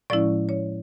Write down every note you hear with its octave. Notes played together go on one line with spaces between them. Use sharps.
A2 F3 G#3 C#4 E4 D5
C#5